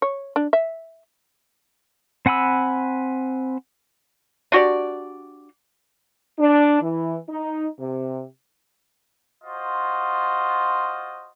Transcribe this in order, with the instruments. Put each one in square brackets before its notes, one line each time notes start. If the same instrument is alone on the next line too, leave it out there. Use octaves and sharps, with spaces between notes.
[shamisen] C#5
D4
E5
[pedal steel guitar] C4 F#5 G#5 B5 E6
[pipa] D4 F#4 G4 D5
[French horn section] D4
E3
D#4
C3
[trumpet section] F4 F#4 C5 D#5